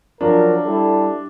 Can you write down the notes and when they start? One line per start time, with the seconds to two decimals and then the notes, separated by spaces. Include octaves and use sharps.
0.21 F3 F#3 D4 A#4
0.65 G3 E4 A4